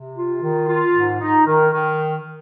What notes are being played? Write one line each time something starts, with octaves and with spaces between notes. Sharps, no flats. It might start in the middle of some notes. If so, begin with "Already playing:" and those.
Already playing: C3
F4
D#3
F4
G#2
D#4
D#3
D#3